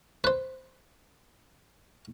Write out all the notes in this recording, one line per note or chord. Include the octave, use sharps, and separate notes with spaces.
B4 C5